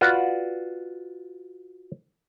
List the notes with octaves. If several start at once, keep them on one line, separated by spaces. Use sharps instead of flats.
F4 F#4 B4 D5